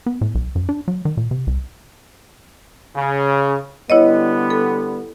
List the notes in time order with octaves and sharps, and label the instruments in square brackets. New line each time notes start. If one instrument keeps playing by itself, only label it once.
[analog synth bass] B3
A2
B1
F#2
D4
F#3
D#3
A#2
C3
C2
[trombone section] C#3
[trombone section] D3 G3 B3 [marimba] E4 C#5 D#5
[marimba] A4